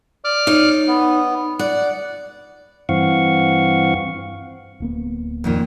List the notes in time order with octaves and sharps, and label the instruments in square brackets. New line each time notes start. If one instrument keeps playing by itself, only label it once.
[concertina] D5 D6 F6
[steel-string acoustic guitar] D#4 C#5
[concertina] B3
[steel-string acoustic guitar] D5 [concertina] F#5
[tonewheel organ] G2 E3 C4 F5 F#5 C#6
[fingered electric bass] D1 A#3 B3
[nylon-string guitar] F2 A#2 D#3